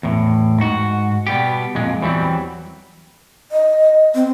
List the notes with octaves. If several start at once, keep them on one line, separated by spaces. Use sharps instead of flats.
E2 A2
G#2 F#4
B2 G3 B3 G4
F2 A#2 G#3
E2 E3 F#3 G3 C4
D#5
C4